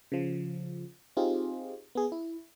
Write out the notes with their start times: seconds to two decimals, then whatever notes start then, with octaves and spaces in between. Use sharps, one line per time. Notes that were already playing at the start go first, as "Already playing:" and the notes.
0.12 C#3 F3
1.17 C4 D#4 F4 G4 G#4
1.95 B3 G#4
2.12 E4